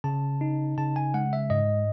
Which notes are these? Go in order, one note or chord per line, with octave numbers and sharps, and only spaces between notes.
C#3 A5
D#4
C#3 A5
G#5
G#3 F#5
E5
G#2 D#5